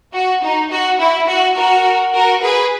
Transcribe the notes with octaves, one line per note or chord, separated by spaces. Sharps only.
F#4
D#4
F#4
E4
F#4
F#4 A#4
F#4 A#4
G#4 B4